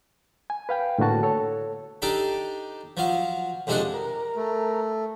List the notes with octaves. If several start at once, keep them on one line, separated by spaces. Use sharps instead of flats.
G#5
B4 F5 G5
A2 D3 A#3 F#4 A5
A4 C#5
D4 D#4 G4 A4 D6
F3 F#3 F5
F2 C3 G#3 D4 D#5 F#5
A#4
A3